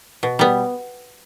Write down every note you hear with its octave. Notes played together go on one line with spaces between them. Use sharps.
B2
G3 B3